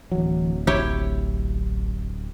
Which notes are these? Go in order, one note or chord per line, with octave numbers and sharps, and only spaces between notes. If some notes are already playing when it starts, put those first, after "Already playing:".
D1 E3 F#3
A1 E4 G4 C#5